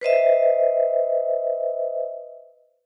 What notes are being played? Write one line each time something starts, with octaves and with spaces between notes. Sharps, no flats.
B4 C5 D#5 E5